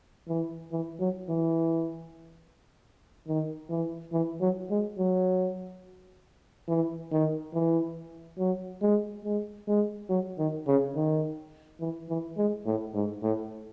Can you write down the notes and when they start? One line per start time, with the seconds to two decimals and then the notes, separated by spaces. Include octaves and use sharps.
0.29 E3
0.72 E3
1.00 F#3
1.29 E3
3.27 D#3
3.70 E3
4.13 E3
4.41 F#3
4.70 G#3
4.98 F#3
6.68 E3
7.12 D#3
7.54 E3
8.39 F#3
8.82 G#3
9.24 G#3
9.68 G#3
10.09 F#3
10.38 D#3
10.67 C#3
10.96 D#3
11.80 E3
12.09 E3
12.37 G#3
12.66 A2
12.94 G#2
13.23 A2